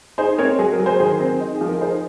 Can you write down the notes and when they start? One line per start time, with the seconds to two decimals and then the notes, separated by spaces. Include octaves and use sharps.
0.18 D#4 G#4 C5
0.38 C4 A#4 C#5
0.59 F#3 G#4
0.72 A#4
0.79 F#3
0.86 G#4 C5
1.00 D#3 G#4 C5
1.20 C4
1.40 D#4
1.55 G#4
1.61 F3
1.68 A#4
1.81 D#4 G#4 C5